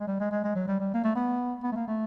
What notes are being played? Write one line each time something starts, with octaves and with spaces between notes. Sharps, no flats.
G#3
G3
G#3
G#3
G#3
F#3
G3
G3
A#3
A3
B3
B3
A3
A#3
A3